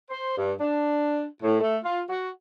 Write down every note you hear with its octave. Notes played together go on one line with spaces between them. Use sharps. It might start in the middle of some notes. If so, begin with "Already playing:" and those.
C5
G2
D4
A2
A3
F4
F#4